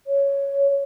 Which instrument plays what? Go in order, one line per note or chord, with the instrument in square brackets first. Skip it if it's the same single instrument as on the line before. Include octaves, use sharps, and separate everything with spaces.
[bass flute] C#5